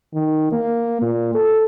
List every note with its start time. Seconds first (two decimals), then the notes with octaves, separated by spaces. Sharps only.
0.14 D#3
0.52 A#3
1.02 A#2
1.35 A4